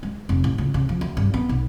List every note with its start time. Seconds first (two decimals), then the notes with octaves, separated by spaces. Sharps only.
0.03 G#3
0.29 F1
0.44 A1
0.58 C#2
0.74 C#3
0.89 F3
1.01 D2
1.17 G2
1.34 B3
1.49 B1